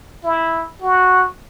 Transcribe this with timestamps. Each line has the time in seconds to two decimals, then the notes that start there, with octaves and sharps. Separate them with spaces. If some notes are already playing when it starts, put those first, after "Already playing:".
0.24 E4
0.81 F#4